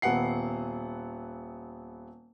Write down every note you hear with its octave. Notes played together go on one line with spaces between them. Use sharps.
D#1 B3 F#5 C7